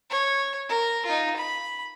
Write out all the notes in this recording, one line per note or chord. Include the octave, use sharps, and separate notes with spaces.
C#5
A#4
D#4 F4
B5